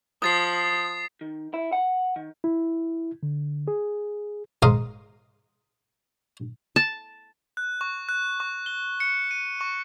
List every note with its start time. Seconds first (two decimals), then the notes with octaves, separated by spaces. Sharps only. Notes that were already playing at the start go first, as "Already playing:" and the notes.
0.22 F3 D#6 A6 C7
1.21 D#3
1.54 E4
1.73 F#5
2.16 D#3
2.44 E4
3.23 D3
3.68 G#4
4.62 G#2 A#4 F5 A#5 C6 D#6
6.76 A5
7.57 F#6
7.81 C#6
8.09 F#6
8.40 C#6
8.66 G7
9.00 C#7
9.31 D#7
9.61 C#6